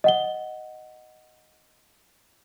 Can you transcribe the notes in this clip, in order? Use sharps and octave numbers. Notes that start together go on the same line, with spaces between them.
D#5 F#5 G7